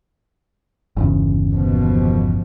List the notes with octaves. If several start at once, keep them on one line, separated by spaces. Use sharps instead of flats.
G1 E2 C#3
D#2 B2 F3